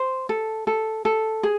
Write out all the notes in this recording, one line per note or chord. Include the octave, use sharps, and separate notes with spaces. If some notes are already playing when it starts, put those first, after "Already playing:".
Already playing: C5
A4
A4
A4
G#4